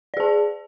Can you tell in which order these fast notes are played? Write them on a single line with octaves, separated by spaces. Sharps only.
D5 G#4 A5